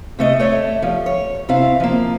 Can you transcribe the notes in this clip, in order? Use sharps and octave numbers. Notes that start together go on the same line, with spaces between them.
C3 A3 D#5
A3 C#5 D5 E5
F3 G3
C#5
C3 C4 E4 F5
F3 A#3